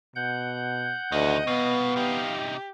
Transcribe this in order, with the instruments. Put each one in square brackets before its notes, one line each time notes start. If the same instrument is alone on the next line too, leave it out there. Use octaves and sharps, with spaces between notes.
[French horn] B2 [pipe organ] F#5 G6
[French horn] D2 [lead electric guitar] D#3 E3 [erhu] D#5
[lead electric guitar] C2 B2 [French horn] B3 [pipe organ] F5
[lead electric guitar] C3 D#4 [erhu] G4